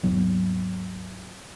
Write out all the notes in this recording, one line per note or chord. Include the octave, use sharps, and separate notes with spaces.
D#2 G#2 F#3 B3